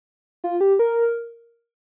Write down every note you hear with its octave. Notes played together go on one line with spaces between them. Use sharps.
F4
G4
A#4